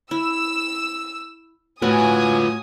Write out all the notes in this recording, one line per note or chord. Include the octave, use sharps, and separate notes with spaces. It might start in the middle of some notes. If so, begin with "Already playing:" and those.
E4 E6
A2 F4 F#4 B4 G#5 D#6